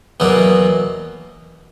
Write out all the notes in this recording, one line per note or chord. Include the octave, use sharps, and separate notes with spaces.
E2 B2 F#3 A#3